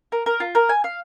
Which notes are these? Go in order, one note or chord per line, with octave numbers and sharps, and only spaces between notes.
A#4
A#4
F4
A#4
G#5
F5